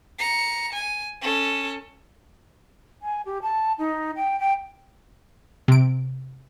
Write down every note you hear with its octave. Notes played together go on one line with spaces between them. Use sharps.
A#5 C#7
G#5
C#4 A4
G#5
G4
A5
D#4
G5
G5
C3 D7